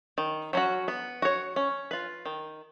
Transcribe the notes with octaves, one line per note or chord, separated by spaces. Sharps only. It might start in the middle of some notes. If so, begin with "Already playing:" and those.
D#3
F#3 C#4 F#4
B3
F#4 C#5
C#4
F4 B4
D#3